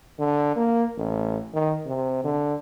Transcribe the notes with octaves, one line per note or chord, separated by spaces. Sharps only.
D3
A#3
A1
D#3
C3
D3